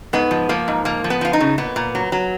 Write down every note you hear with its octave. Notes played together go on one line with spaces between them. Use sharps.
G#2 B3
F3
F3 A#3
G#2
F3 A#3
F3
B3
F3 F4
D#4
C#3
A#2 B3
A#2
F#3
F#3